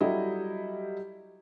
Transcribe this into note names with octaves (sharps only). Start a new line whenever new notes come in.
F#3 G3 E4 G4 A4 D#5